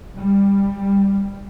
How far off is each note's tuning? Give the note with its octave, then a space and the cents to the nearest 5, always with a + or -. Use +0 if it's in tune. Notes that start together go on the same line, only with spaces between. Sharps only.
G3 +15